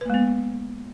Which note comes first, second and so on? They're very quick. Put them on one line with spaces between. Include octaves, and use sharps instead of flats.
B4 A#3 G#3 B3